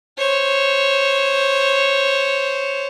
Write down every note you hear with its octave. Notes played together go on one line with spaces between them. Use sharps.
C5 C#5